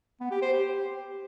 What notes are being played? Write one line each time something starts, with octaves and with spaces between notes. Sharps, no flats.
B3
G4
C5
G4